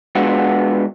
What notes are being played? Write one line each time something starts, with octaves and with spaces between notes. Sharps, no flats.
G#3 B3 D4 F4 F#4 F#5